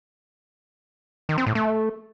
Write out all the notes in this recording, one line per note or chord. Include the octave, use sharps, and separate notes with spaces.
D#3
C4
A2
A3